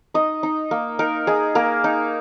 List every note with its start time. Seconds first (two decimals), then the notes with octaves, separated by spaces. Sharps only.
0.14 D#4 D#5
0.43 D#4
0.71 A#3
0.99 D#4 A#4
1.27 D#4 G#4
1.55 A#3 A#4
1.84 D#4